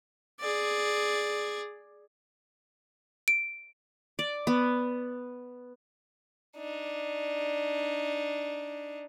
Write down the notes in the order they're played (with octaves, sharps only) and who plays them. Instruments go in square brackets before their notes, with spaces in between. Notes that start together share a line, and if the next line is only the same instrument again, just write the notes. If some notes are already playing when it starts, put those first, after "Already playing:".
[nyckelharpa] G#4 D5
[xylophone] D7
[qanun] D5
B3
[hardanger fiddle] D4 D#4